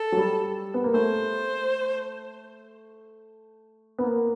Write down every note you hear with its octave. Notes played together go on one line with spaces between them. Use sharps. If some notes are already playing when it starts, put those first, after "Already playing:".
Already playing: A4
F#3
G3
B3
A#3
A3 C5
B3
A#3